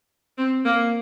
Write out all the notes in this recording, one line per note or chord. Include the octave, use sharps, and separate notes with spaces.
C4
A#3